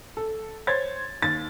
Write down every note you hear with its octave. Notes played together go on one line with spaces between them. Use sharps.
A4
C5 C#5 C6 G#6 A6
D#2 A6